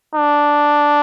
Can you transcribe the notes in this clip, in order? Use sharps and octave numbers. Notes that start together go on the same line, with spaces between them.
D4